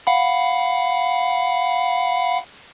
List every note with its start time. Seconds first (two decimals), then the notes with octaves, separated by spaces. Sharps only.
0.07 F5 F#5 B5